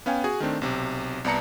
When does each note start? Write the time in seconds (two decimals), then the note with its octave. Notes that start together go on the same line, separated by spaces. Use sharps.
0.06 B3 C#4 F5 G5 G#5
0.24 F#4 G#4 G#5
0.40 D#3 A3 C4 D4
0.62 B1 C3
1.24 C2 B3 D5 A5 A#5 C#7